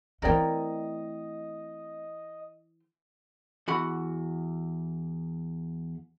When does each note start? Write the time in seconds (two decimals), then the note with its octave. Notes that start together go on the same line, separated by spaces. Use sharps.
0.22 E3 A3 C4 A#4 C5 D5 D#5 G5
3.68 E2 F#4 B5